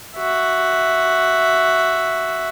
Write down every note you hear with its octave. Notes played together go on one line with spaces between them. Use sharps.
F#4 E5